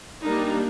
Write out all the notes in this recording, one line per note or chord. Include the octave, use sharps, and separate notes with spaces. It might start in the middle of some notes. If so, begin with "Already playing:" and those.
G3 A#3 D4 D#4